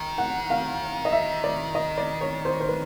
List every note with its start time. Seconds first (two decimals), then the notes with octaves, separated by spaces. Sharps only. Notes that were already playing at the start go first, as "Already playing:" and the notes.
Already playing: D#3
0.18 F#5
0.50 F5
1.05 D#5
1.12 E5
1.44 D5
1.75 D#5
1.98 D5
2.21 C#5
2.45 C5
2.60 C5
2.69 B4